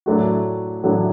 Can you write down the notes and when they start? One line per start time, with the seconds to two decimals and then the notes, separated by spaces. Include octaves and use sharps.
0.06 A2 F#3 A3 D4 F#4
0.83 A2 F#3 A3 D4 F#4